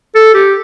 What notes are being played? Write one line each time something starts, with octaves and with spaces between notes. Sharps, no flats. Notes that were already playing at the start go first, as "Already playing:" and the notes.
A4
G4